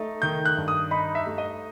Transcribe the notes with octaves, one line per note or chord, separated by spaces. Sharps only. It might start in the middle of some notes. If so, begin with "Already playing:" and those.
Already playing: A3 D#4
D#3 G6
F#6
G2
D#6
D#4 B5
E5
A3
D#5